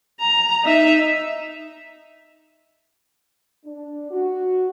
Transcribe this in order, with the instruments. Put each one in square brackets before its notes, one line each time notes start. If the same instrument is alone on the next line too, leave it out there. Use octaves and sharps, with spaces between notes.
[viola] A#5
D#4 E5
[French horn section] D4
F#4